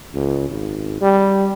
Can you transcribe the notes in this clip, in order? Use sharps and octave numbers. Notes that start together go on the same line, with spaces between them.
C#2
G#1
G3